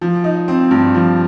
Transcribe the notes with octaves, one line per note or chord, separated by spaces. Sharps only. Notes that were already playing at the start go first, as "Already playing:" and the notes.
F3
D#4
C4
G2
F3